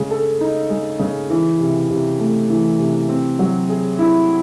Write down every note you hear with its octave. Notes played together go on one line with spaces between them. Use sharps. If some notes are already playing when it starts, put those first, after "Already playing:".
Already playing: C#3 G#3
A4
D#4
G#3
C#3
E3
C3
C3
A3
E3
C3
C4
F#3
G#4
E4